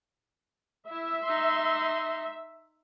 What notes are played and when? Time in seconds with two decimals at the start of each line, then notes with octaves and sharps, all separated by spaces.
0.89 E4 E5
1.24 D#4 C6